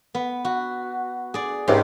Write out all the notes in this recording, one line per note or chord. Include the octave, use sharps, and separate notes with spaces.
B3
F#4
G#4 D5
C#2 G#2 C3 C6